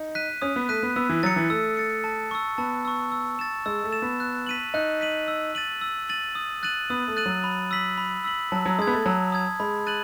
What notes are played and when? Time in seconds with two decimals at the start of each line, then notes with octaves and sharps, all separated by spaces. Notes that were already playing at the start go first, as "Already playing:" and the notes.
Already playing: D#4
0.15 F#6 B6 D#7
0.42 C#4 D#6
0.56 B3
0.69 A3 F#6 B6 D#7
0.83 B3
0.96 B3 E6
1.09 E3
1.23 F#3 A6 C#7
1.36 E3
1.50 A3 E6
1.77 A6 C#7
2.04 A5
2.31 C#6 E6
2.58 B3 A5
2.85 C#6 E6
3.12 E6
3.39 A6 E7
3.66 G#3 E6
3.84 A3
3.92 A6 E7
4.02 B3
4.20 F#6
4.47 B6 D#7 F#7
4.74 D#4 F#6
5.01 B6 D#7 F#7
5.28 E6
5.55 A6 D#7 F#7
5.81 E6
6.09 A6 D#7 F#7
6.35 D#6
6.63 F#6 A6 D#7 F#7
6.90 B3 D#6
7.08 A3
7.17 F#6 A6 D#7 F#7
7.26 F#3
7.44 B5
7.71 E6 B6 F#7
7.98 B5
8.24 E6 B6 F#7
8.52 F#3 A5
8.66 F#3
8.79 G#3 D#6 G#6
8.87 B3
8.93 A3
9.05 F#3 A5
9.32 D#6 G#6
9.60 G#3 B5
9.87 F#6 A6 D#7 F#7